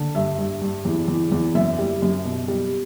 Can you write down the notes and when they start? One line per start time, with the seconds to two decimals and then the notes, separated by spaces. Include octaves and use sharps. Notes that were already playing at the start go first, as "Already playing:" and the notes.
Already playing: D3
0.15 G2 E5
0.38 G2
0.62 G2
0.85 E2
1.08 E2
1.32 E2
1.55 F#2 E5
1.79 G3
2.02 F#2
2.25 B2
2.48 G3